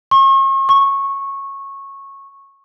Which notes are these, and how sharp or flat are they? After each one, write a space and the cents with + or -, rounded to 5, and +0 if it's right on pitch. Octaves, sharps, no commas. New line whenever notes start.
C#6 -40
C#6 -15